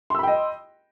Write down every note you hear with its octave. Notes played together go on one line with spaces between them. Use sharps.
D#5 G5 B5 C6 E6